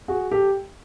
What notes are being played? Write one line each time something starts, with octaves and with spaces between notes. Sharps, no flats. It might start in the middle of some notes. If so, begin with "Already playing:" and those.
F#4 G#4
G4 A4